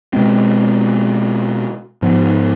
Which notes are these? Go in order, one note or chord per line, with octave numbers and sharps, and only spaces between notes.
B2 G#3 C4
G#2 F3 B3